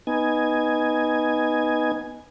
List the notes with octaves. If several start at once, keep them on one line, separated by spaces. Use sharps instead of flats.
B3 D#4 G#5